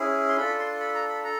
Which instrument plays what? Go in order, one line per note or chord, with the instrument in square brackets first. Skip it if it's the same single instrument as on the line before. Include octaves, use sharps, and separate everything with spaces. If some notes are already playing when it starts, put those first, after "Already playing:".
Already playing: [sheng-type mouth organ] C#4 E4 G#4
C6
D4 F4 A4 B5
C6
B5
A#5
B5
A4 A#5